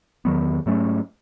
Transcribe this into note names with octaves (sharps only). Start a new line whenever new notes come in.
E2 D#3 F#3 B3
G#2 F#3 A3 C#4